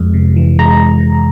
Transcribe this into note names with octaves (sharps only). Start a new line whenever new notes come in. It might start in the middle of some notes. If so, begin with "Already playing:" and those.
Already playing: F2 G#3
C3
E3
G#3 A#5